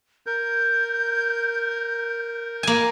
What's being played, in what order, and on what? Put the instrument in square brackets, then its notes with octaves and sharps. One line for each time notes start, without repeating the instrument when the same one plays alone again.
[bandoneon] A#4 [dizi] G6
[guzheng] A#3 G#5